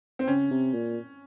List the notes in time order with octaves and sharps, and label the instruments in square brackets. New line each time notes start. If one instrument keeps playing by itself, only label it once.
[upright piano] C4
[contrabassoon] C#3 [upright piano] C#4
[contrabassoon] C3
A#2